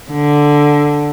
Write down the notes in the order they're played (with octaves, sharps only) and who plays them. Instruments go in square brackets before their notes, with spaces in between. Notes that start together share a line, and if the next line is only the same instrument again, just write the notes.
[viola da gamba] D3